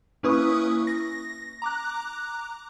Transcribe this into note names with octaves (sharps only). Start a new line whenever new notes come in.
A#3 C#4 E4 B4 C#6 D#6
A#6
A#5 D6 F#6